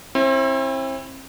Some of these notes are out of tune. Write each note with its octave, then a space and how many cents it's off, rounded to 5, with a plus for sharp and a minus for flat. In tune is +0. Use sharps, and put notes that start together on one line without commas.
C4 +40 E4 +5